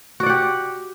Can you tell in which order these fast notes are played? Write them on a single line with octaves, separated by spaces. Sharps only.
F#4 D5 F#5 G4